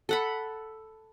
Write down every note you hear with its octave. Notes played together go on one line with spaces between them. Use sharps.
A4 F#5 B5